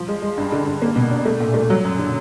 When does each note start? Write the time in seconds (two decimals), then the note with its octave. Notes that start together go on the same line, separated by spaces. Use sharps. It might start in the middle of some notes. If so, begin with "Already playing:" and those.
Already playing: F3
0.08 G#3
0.22 G#3
0.38 G2
0.52 D3
0.67 G2
0.82 A#3
0.96 B2
1.11 D4
1.26 A3
1.40 A#2
1.54 A3
1.70 F#3
1.84 F#2
1.99 D3